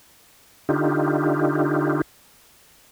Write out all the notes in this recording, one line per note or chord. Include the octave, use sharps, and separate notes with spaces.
D3 D#4 F4 G4